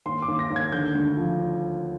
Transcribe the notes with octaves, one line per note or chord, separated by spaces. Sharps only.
D#2 C6
D6
D#2
A#6
D#2
G#6
D3 G6
D2
F3